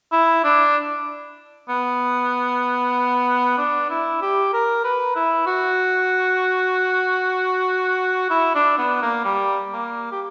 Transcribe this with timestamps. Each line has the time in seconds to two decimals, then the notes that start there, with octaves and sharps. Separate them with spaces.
0.12 E4
0.44 D4
1.69 B3
3.58 D4
3.90 E4
4.22 G4
4.53 A#4
4.84 B4
5.16 E4
5.47 F#4
8.30 E4
8.55 D4
8.78 B3
9.02 A#3
9.25 G3
9.73 A#3
10.12 G4